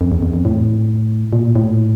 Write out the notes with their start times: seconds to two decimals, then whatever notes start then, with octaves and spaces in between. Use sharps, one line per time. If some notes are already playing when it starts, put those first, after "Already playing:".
0.01 F2
0.12 E2
0.23 E2
0.33 F2
0.45 A2
1.33 A#2
1.55 A2